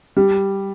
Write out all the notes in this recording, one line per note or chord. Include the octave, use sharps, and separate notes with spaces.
G3